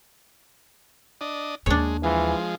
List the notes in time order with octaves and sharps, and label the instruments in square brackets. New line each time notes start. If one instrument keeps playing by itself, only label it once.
[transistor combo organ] D4 D#5
[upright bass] D#2 D#3 [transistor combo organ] G#3 [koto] D4 C#5
[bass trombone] E3 [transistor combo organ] F3 G#3